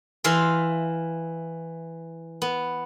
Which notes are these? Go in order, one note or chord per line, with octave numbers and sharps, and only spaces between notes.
E3 E5 F5 C6
B3